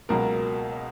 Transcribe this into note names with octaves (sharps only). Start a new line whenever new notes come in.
C#2 B2 F#3 A#3 A#4